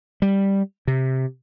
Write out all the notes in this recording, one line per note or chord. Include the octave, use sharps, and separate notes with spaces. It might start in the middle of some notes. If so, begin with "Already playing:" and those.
G3
C3